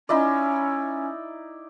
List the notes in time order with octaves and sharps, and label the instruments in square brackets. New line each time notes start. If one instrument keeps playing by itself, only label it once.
[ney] C#4 [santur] D#4 E4 D5